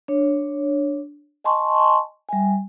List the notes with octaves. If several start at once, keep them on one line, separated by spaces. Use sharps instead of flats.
D4 C#5
D#5 G#5 A5 C6 C#6
G3 E5 G#5